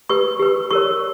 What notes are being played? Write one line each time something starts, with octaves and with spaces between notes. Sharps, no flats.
G4 B4 C#6
G4 B4
G4 A#4 C#5 C#6